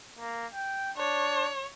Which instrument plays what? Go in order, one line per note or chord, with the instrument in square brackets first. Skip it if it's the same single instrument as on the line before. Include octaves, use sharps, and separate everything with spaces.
[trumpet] A#3
G5
[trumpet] D4 [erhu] C#5